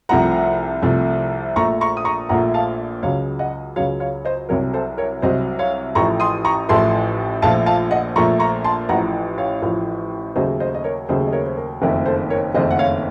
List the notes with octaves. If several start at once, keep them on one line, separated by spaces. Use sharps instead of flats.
C2 C3 F3 A3 F#5 A#5
C2 C3 F3 A3
A#1 A#2 A3 A#5 C#6
A#5 C#6
D#6
A#5 C#6
A#1 A#2 A3 F#5 A#5
F5 A5
C#2 C#3 F#3 C#5 F5
D#5 F#5
C#2 C#3 F#3 C#5 F5
C#5 F5
C5 D#5
C2 C3 F#3 A#4 C#5
A4 C5
A#4 C#5
C2 C3 F#3 C5 D#5
C#5 F5
A1 A2 F3 A3 A#5 C#6
C6 D#6
A#5 C#6
A1 A2 F3 A3 A5 C6
A#1 A#2 F3 A3 F5 A5
F5 A5
D#5 F#5
A#1 A#2 F3 A3 A#5 C#6
A#5 C#6
A5 C6
A1 A2 F3 F#5 A#5
C#5 F5
A1 A2 F3
D#2 C#3 F#3 A3 C5 D#5
C5 D#5
D#5
A#4 C#5
D#2 C#3 F#3 A3 C5 D#5
D#5
A#4 C#5
C5
A#4
F#1 F2 D#3 A3 A#4
A4 C5
A#4 C#5
F#1 F2 D#3 A3 C5 D#5
F#5
C#5 F5